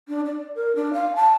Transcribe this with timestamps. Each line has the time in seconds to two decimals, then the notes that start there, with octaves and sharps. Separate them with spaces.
0.08 D4
0.26 D5
0.55 A#4
0.76 D4
0.93 F5
1.16 A5